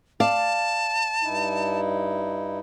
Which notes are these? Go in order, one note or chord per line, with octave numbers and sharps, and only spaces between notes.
D5 F5 A5
G2 D#4 E4